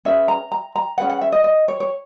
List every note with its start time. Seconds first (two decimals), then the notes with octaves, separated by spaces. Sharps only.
0.05 C#4 G#4 B4 E5
0.28 A#5
0.52 A#5
0.76 A#5
0.98 C#4 G#4 B4 F#5
1.10 F#5
1.21 E5
1.32 D#5
1.44 D#5
1.68 C#5
1.80 C#5